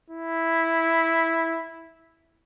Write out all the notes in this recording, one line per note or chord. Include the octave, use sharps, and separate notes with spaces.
E4